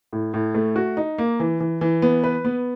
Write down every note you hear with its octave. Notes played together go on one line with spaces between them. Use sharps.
A2
A2
A3
F#4
D#4
A#3
E3
E3
E3
B3
B4
B3